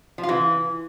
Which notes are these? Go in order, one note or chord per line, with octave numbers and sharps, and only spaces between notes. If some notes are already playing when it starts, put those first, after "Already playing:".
F3
F4
E3